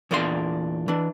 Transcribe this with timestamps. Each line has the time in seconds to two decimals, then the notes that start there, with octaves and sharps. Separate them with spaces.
0.11 E2 A#2 A#3 D4 E4 C6
0.88 E3 D4